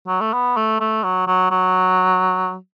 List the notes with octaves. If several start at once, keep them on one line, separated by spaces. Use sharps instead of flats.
F#3
A3
B3
A3
A3
F#3
F#3
F#3